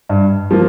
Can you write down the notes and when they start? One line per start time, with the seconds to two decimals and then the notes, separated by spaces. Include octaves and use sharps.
0.09 G2
0.51 F3 A#3